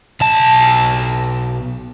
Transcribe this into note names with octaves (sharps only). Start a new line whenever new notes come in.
B1 A5